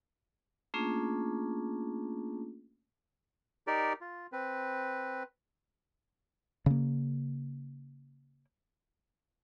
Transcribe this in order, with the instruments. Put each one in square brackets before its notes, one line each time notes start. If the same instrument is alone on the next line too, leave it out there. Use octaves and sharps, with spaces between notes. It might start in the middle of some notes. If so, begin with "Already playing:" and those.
[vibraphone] A3 A#3 C#4 D4 F4 G#4
[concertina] D#4 G4 A#4 D5
F4
C4 B4
[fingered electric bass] C#3 A#3